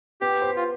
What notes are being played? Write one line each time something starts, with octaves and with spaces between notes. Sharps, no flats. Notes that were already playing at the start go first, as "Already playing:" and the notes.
B3 G4
C5
F4